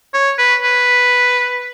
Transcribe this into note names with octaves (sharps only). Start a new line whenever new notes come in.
C#5
B4
B4